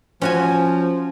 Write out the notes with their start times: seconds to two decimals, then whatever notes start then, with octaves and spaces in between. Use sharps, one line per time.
0.22 F3 C#4 F#4 G#5